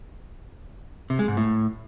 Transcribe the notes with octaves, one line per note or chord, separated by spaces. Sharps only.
C3
G#3
G#2
A2